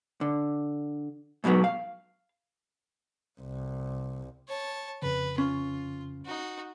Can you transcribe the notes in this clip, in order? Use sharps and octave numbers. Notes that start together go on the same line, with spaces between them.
D3
G#2 B2 F3 F#3 B3
F5
C2
C#5 A5
F2 C#3 B4
C#4 F4
D#4 F#4